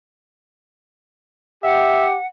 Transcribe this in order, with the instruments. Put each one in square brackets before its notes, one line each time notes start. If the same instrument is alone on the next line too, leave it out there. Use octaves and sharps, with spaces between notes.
[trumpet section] G4 [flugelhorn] E5 [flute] F#5